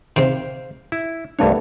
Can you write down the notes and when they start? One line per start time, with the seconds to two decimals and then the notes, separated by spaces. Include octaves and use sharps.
0.16 C3 D#3 C5 F5
0.92 E4
1.39 C2 G2 A3 B3 D4 C#5